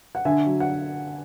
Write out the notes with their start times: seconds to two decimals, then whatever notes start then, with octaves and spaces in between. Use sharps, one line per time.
0.15 F#5
0.25 D3 E5 G#5
0.46 F#3
0.60 F#5